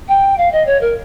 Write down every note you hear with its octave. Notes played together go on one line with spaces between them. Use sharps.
G5
F5
D#5
C#5
A#4